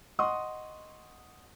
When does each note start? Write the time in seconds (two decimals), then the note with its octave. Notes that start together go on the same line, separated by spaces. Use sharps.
0.19 D#5 F#5 C6 C#6 D#6